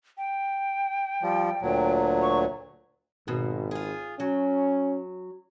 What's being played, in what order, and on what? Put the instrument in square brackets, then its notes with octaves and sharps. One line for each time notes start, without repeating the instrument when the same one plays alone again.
[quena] G5
[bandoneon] F3 G3
D2 A#2 F#3
[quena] C#6
[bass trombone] G#1 [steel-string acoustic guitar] G#2 B2
[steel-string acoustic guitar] F4 G#4
[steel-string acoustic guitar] F#3 [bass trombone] C#4